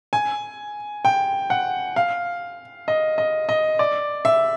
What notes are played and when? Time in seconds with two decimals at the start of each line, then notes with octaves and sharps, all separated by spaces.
0.13 G#5
1.05 G5
1.50 F#5
1.96 F5
2.88 D#5
3.18 D#5
3.49 D#5
3.79 D5
4.25 E5